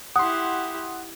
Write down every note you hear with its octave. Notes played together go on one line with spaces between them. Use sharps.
E4 G4 F#5 C6 D#6